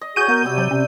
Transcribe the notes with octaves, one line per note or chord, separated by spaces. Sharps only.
D#5
F#4 G#4 C#5 G6 D#7
B3 A#4
C3 G3 E6
F#3 D5
C3 C#4